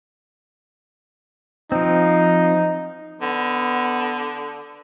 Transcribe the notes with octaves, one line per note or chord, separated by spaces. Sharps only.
F3 C4 D#4
D3 B3